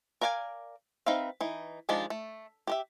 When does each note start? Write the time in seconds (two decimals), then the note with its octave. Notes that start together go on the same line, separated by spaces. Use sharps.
0.21 A#4 D5 F5 G5 G#5
1.06 C4 D#4 B4 E5 F5
1.41 E3 D#4
1.89 D#3 F3 G#3 D4 G4
2.10 A3
2.67 G4 A#4 E5